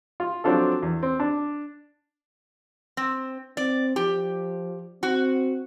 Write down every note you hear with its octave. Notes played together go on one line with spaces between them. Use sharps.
F4
F3 F#3 C4 D4 F4 A4
E2
C4
D4
C4
C4 D5
F3 G4
C4 F#4